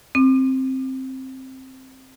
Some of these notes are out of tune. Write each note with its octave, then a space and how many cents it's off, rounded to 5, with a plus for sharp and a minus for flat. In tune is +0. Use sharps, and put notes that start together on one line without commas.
C4 +10 D6 +40